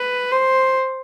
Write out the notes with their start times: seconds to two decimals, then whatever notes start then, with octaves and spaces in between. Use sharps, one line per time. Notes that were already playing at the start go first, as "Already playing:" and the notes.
Already playing: B4
0.32 C5